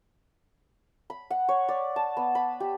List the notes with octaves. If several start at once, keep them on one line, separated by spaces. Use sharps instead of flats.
B5
F#5
C#5
D5
A5
B3
B5
G4